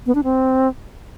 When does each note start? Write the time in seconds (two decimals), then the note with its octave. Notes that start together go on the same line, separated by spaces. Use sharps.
0.06 B3
0.15 D4
0.24 C4